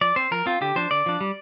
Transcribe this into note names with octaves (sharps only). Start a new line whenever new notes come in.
F3 D5
C4 C5
F3 A#4
C4 F4
D3 G4
F3 D4 C5
D3 D5
F3 D4
G3